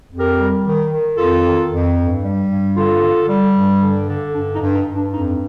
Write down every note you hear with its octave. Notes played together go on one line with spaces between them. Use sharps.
F2
G4 A#4
G3
D#3
D#3
F2 F4 A4
D#3
F2
G2
G3
G2
D3 F4 A4
D3
G3
G2
D3
D3
G2 D4
D#4
G2
D#4
G2
D4
F2 D#4